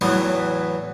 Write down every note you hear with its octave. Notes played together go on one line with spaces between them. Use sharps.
E2 A2 E3 F#3 B3